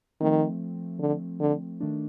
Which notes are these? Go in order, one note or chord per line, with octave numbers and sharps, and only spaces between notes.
D#3 F3 A3 C4
D3
D3
D#3 A3 D4